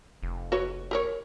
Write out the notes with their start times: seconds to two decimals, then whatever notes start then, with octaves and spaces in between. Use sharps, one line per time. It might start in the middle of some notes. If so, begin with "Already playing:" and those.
0.23 F1
0.52 F#4 B4 C#5
0.91 G4 A#4 C#5